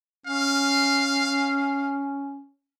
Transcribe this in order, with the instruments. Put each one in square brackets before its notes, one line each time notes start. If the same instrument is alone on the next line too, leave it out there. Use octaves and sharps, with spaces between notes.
[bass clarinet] C#4 [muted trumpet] F5